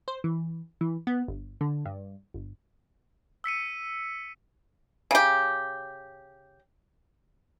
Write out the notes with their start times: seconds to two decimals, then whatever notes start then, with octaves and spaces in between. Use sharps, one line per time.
0.08 C5
0.24 E3
0.81 E3
1.07 B3
1.28 G1
1.61 D3
1.86 G2
2.34 G1
3.44 E6 B6 C#7 D#7
5.11 C#3 G4